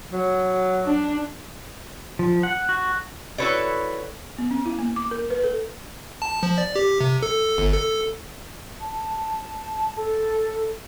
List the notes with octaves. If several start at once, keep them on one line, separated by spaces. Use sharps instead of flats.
F#3
D4
F3
F#5
F#4
E4 F#4 A4 B4 C#5 D5
B3
C#4
E4
A#3
D6
A#4
B4
A4
A5
F3
D5
G4
C3
A4
G1
A4
A5
A4